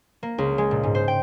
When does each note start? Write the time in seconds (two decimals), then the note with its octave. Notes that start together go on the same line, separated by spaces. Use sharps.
0.23 A#3
0.38 C#2
0.58 G#3
0.71 A#2
0.83 G#2
0.95 C5
1.08 G5